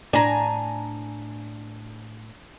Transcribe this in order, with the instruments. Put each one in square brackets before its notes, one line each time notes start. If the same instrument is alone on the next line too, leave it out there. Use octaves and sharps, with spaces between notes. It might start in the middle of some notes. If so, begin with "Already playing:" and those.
[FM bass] A2 [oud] D4 [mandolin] G#5 A#5